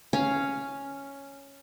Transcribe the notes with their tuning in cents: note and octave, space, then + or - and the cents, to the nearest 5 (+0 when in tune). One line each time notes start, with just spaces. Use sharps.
C#4 +0 F5 +0